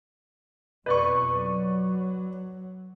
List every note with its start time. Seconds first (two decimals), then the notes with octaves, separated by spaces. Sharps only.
0.86 F2 B2 B4 D5 C#6
1.36 F#3